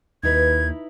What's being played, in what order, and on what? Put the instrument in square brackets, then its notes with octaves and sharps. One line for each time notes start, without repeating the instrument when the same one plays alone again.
[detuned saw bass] D#2 [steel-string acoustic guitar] D#4 E4 B4 [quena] G#6